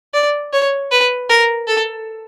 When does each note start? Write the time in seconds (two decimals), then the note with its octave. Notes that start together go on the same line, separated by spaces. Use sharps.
0.14 D5
0.53 C#5
0.91 B4
1.29 A#4
1.67 A4